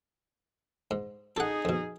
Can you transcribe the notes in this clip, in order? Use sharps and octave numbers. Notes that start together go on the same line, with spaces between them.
G#2
D#4 G#4 A4 F#5
F2 B2